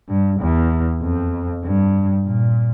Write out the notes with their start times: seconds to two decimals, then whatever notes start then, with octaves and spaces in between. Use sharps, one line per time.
0.08 G2
0.40 E2
1.02 F2
1.64 G2
2.27 A#2